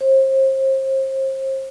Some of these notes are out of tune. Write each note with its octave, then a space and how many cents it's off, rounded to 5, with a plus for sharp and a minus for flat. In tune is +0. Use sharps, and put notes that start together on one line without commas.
C5 +35